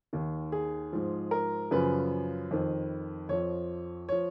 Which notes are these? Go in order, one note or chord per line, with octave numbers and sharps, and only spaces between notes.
D#2 D#3
G#4
G#2 F3
A#4
F#2 C#3 F3 B4
F2 D#3
F2 F3 C#5
F3 C#5